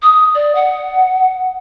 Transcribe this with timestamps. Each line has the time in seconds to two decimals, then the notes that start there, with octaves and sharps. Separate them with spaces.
0.03 D#6
0.35 D5
0.55 F#5